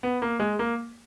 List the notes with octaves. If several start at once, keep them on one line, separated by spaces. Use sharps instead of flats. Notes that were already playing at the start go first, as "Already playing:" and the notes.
B3
A#3
G#3
A#3